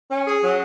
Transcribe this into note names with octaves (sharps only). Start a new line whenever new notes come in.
C#4
G#4
F#3